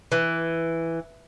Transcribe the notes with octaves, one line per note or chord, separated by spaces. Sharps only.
E3